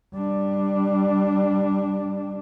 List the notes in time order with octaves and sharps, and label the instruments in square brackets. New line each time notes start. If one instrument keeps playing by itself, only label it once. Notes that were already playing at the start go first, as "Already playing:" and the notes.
[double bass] G3 D4